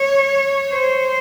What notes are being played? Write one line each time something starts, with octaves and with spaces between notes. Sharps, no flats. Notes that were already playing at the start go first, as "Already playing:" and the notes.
Already playing: C#5
C5